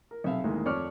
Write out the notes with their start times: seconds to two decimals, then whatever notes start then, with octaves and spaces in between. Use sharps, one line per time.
0.11 A#4
0.24 B1 C3 E5 F5
0.44 D2 A2 D#3 G#3 A#3
0.66 F2 C#5 D5 C#6 D6 F6